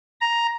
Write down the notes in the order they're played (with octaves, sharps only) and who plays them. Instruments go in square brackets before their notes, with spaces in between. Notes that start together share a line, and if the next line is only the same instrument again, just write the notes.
[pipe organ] A#5